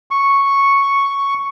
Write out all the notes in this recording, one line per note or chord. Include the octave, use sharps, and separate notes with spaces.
C#6